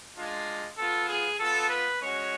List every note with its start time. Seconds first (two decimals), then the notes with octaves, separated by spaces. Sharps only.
0.16 G#3 D4 F4
0.77 B3 F4 A4
1.09 G#4
1.39 B3 F4 A4
1.70 B4
2.01 G#3 C#4 F#4 C#5